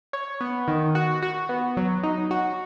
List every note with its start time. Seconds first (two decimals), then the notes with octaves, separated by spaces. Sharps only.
0.13 C#5
0.41 B3
0.68 D#3
0.95 F#4
1.22 F#4
1.49 B3
1.77 F#3
2.03 D#4
2.31 F#4